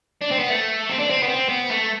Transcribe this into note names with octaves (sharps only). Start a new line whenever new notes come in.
D4
C4
B3
A3
C4
D4
C4
B3
C4
B3
A3